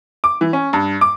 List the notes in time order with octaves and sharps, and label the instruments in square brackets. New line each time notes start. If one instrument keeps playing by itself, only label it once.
[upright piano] D6
E3
C#4
G2
D6